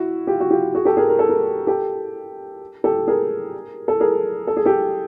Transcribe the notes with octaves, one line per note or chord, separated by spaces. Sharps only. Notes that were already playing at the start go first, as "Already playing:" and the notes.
Already playing: E4 F#4
F4 G4
F#4
F4 G4
F#4 G#4
G4 A4
G#4 A#4
A#4
A4
G#4 A#4
G4 A4
G4 A4
G#4 A#4
A4
G#4 A#4
A4
G#4
G4 A4